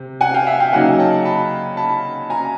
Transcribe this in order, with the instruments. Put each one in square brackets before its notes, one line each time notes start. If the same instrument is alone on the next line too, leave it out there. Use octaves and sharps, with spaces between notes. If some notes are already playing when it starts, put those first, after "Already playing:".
Already playing: [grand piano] C3
F#5 G#5
F5 G5
E5 F#5
F5 G5
C#3 F#3 A#3 D#4 F#5 G#5
G5 A5
A5 B5
A5 B5
G#5 A#5